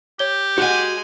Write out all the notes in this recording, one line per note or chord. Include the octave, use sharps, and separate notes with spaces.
G4 C#5 G7
G#3 F#4 F#5 G#5